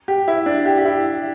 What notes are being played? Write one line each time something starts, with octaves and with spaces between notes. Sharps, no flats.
G4
E4
D4
G4
G4
E4